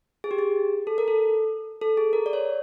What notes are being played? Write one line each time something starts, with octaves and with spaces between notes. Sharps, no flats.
G#4
G4
G#4
A4
A#4
A4
A4
G#4
A#4
D5
C#5